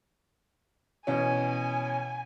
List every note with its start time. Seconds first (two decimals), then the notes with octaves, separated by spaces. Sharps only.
1.07 B2 E3 C#4 G#5